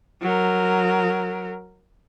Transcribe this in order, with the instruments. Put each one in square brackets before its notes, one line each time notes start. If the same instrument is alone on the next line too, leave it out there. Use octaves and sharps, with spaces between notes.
[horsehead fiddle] F#3 A#4